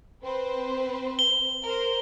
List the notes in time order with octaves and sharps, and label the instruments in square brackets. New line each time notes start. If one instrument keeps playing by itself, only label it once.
[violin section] C4 B4 C5
[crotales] G7
[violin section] A#4 C5